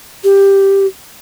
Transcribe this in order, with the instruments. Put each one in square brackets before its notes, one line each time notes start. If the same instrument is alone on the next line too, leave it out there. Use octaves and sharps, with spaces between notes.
[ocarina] G4